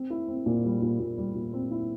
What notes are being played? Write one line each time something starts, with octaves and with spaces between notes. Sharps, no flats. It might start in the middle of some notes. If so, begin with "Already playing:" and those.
Already playing: C4
E4
C4
A#2
G3
A#2
A#2
G3
A#2
C4
E4